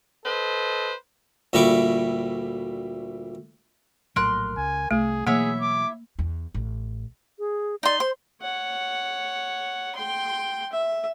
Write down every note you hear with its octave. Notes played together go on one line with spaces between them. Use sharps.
A4 B4 C5 D#5
D2 A#2 G3 E4 C#6 D6
A#1 A2 F#3 A#4 C6 F#6
C#2 G#5
C2 A3 G#4
B2 E3 F#3 A#3 E4 G#4 C#5 E5
D6
E2
A1
G#4
D#4 D5 C6
C5 C6
C#5 F#5
G5 C6
E5